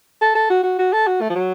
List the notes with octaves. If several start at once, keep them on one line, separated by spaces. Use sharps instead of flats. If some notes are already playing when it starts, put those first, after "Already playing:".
A4
A4
F#4
F#4
F#4
A4
F#4
A3
F3
F#3